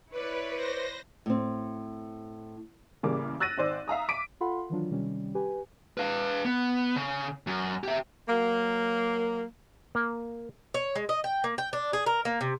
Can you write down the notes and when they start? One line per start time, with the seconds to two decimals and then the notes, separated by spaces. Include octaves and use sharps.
0.11 E4 B4 C#5 D5
0.55 C5 A#6
1.26 A2 C4
3.03 A1 C#3 G3 A#3 D6
3.40 E6 F#6 A6 A#6 D#7
3.58 G#1 C5 D5
3.88 E5 F5 A#5 D#6
4.09 D6 B6 D7 D#7
4.41 F4 A4 F5 F#5 B5 C6
4.70 D#3 E3 F#3 D4 F4
4.91 C3 D#3 G3 C#4
5.35 G4 B4 G#5
5.98 B4 F5
6.45 B3
6.96 C#3
7.47 F#2
7.84 G4 E5
8.28 F#3 A#3
9.95 A#3
10.74 C#5
10.95 G#3
11.09 D#5
11.24 G5
11.44 A#3
11.58 G5
11.73 D4
11.93 G#4
12.06 A#4
12.25 A#3
12.41 C3